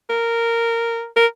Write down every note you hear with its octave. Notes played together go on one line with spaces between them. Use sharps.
A#4
A#4